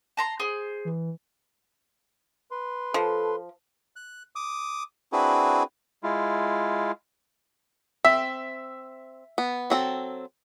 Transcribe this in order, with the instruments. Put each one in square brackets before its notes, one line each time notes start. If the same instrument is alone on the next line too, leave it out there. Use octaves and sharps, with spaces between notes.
[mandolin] A5 A#5 C6
G#4 C5
[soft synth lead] E3
[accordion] B4 C6
[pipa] F3 [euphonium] A4
[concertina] F#6
D6 D#6
C4 D4 E4 F#4 G#4 B4
G#3 E4 F4
[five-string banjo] C4 [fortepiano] E5
[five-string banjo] B3
F#3 C4 A4